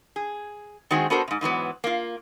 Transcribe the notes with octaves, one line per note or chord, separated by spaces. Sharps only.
G#4
D#3 G#3 C4 F#4 G#4
B3 D4 F#4 A4 A#4 C5
G#2 C3
G#2 E3 F#3 B3
A#3 F4